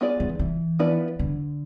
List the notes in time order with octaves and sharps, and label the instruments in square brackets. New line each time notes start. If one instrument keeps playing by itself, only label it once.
[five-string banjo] B3 F4 G#4 D5
[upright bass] E3
E3
[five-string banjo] F3 B3 E4 B4 D5
[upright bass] D3